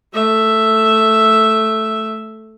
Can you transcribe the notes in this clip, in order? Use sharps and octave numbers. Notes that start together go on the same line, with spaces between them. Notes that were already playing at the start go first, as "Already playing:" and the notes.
A3 E5